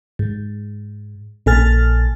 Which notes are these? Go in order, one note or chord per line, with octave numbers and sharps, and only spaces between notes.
G#2
A#1 A#2 A4 G#5 F6 A6